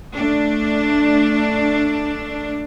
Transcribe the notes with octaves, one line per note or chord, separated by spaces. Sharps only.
A3 D4